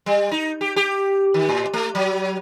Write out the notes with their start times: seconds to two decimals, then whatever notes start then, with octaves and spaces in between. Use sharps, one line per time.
0.06 G3
0.31 D#4
0.61 G4
0.76 G4
1.34 D#3
1.49 A2
1.73 A3
1.95 F#3